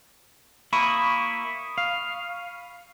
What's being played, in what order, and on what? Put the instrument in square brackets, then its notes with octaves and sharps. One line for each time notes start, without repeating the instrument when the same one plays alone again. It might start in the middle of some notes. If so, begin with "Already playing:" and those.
[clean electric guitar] A#3 E4 [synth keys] B5 C#6 D#6
[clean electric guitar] F5